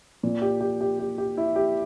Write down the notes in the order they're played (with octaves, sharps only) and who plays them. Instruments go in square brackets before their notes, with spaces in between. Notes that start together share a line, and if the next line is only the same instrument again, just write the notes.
[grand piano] A#2
G4
G4
G4
G4
G4
E4
G4